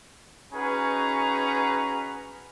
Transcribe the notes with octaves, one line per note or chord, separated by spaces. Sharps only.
C#4 D#4 F#4 G#4 B4 A#5